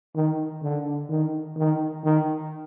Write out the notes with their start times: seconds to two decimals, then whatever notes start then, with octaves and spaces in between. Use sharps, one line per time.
0.15 D#3
0.63 D3
1.10 D#3
1.57 D#3
2.04 D#3